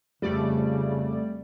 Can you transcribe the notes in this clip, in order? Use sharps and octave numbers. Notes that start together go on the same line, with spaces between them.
F2 C#3 G3 A3 D5